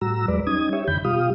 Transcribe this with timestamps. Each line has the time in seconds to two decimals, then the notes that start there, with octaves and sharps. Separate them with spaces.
0.01 A2 G3 F#4 A#5 E6
0.28 E2 F#3 G#3 B4 D5
0.47 G3 C#4 D#4 D#6 G#6
0.73 G4 C#5 E5
0.88 F2 D3 D#3 G5 B5 G6
1.05 B2 G3 F4 G4 F5 D#6